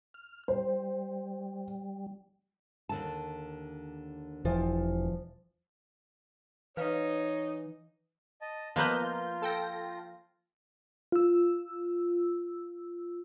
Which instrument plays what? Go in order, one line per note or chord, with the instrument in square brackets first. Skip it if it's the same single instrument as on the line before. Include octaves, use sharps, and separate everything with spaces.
[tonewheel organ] F6
[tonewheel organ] G3 [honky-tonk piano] C5
[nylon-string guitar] D#2 D3 A5
[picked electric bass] E1 E3 [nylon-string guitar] F3
[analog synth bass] E3 [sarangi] D#4 [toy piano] B4 F5 [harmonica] C#5
[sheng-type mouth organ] D#5 A5
[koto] F3 A#3 B4 [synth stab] B3 A#5 G6 [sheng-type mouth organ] D#5
[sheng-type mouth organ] F4
[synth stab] A4 G5 A#6
[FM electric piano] F4 E6